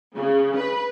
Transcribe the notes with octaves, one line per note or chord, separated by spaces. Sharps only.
C#3
B4